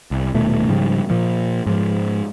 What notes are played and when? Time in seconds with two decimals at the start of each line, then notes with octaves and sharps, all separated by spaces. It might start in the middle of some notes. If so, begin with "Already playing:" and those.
0.11 C2
0.34 D#1 B2 A3
0.68 G#2 C#3 F3 G3
1.10 A#2 F3
1.67 G#2 F3